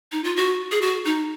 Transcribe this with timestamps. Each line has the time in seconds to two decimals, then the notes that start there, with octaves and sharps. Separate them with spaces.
0.12 D#4
0.24 F4
0.36 F#4
0.72 G#4
0.82 F#4
1.05 D#4